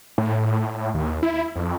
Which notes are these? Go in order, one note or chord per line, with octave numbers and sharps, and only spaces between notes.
A2
D#2
E4
F2